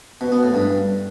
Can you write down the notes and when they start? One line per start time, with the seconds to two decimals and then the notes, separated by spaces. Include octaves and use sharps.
0.21 B2
0.32 B3
0.43 A2
0.54 G2